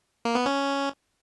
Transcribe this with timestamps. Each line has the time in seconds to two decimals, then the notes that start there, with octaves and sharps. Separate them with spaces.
0.25 A#3
0.35 B3
0.46 C#4